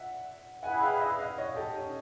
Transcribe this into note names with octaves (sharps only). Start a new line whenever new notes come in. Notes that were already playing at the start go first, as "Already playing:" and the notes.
Already playing: E5 F#5
E4 G#4 B4 F#5 G#5
F5 G5
D#5 F5
D#5 F5
C#5 D#5
G4 A4
C#4 D#4